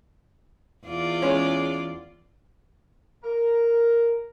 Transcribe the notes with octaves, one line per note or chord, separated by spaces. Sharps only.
E2 F4 D5
G#3 C#4
A#4